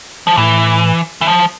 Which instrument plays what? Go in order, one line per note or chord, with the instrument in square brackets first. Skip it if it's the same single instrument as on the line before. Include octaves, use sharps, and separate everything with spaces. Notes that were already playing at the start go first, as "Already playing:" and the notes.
[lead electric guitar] F3
[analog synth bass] A2 [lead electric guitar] E3
[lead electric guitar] E3
F3